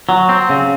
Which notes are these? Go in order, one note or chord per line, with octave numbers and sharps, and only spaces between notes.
F#3
C4
C#3